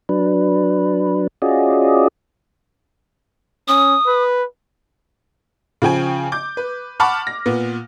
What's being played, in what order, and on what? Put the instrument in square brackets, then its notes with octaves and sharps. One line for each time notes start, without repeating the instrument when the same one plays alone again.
[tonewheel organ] F#3 D4 B4
C#4 F4 F#4 G#4 D5 D#5
[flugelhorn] C#4 [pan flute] D#6
[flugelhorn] B4
[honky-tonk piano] C#3 F3 G5 G#5
D6 G6
B4
F#5 A5 B5 C#6 D6 F6
A#6
A#2 B3